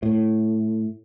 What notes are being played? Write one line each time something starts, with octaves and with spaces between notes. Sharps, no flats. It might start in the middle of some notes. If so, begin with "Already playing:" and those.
A2